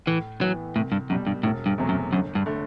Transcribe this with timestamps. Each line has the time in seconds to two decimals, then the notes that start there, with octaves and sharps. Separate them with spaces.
0.06 A2 E3
0.41 E3 F#3 B3
0.76 C2 A2
0.92 G2
1.09 F#2 B2 G3
1.27 G2
1.43 E1 A2
1.66 G2
1.78 E2 C3 F#3 A3
1.89 F#2
2.12 G1 F#2
2.35 G2
2.46 D3 A3